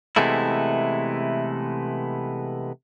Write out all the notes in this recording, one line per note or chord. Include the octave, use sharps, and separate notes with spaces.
C3 E3 G#3 A3 B3 E4